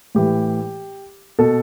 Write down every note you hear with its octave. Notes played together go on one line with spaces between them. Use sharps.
A2 E3 G4
B2 A4